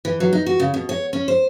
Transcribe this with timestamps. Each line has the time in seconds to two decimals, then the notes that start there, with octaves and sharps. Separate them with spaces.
0.05 E3
0.20 F#3
0.33 D#4
0.46 F#4
0.60 C#3
0.74 B2
0.89 C#5
1.13 C#4
1.28 C5